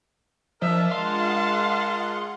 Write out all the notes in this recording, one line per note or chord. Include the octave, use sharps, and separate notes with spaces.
F3 D4 A#4 D#5 E5 A5
G#3 F4 F5 F#5 C6